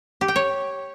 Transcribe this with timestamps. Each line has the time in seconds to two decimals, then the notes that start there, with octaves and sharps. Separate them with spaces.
0.21 G4
0.28 G5
0.36 C#5